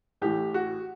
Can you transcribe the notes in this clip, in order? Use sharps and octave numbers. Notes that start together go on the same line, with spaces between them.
A1 A2 E3 G4
F#4